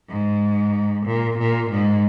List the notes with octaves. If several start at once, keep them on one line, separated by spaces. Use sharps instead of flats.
G#2
A#2
A#2
G#2